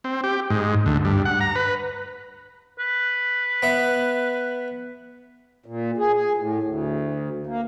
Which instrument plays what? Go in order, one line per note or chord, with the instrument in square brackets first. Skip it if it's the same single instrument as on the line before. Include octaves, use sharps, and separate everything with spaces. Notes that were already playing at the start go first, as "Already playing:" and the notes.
[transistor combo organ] C4
G4
G#2
D2
G2
F#5
A#5
B4
[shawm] B4
[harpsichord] B3 E5
[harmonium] A#2
G#4
G#4
A2
D2
A#3